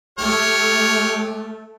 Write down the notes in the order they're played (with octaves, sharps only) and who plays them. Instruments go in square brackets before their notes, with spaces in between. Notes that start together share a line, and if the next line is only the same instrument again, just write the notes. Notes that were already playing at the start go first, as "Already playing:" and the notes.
[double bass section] A3 [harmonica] G4 C#5 F6